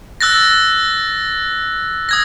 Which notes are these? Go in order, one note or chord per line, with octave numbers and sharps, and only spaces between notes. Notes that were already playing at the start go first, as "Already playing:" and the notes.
E6 F#6 A6 A#6
D#6 G#6 A#6